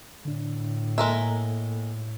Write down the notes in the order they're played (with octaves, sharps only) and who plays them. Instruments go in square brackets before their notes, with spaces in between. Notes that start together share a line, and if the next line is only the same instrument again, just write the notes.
[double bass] A2 [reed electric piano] D3 D4
[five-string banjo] G#3 A#4 E5 [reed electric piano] A#3 A4